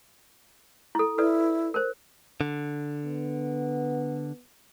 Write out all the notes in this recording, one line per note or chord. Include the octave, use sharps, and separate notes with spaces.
E4 A4
E4 A4 B4 D5
A#4 C5
D3
B3